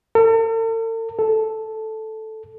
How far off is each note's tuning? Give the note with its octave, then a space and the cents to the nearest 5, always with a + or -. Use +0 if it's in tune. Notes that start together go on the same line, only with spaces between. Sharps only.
A4 +45
A4 -5